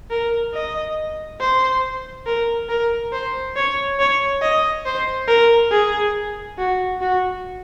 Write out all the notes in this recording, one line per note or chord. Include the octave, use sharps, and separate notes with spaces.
A#4
D#5
C5
A#4
A#4
C5
C#5
C#5
D#5
C5
A#4
G#4
F#4
F#4